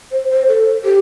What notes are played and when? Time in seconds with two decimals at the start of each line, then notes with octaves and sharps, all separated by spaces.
0.12 C5
0.30 C5
0.48 A4
0.84 G4